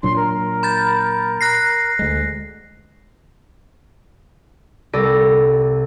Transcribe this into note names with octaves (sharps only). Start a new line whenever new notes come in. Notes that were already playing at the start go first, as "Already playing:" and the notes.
A#2 F#3 D4 C6
A#4
B5 G6 A6
F#6 A#6 C7
D2 G#3
C2 A4 D5 A#6 D#7